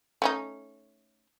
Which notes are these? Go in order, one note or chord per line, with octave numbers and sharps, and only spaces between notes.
A3 C#4 D#4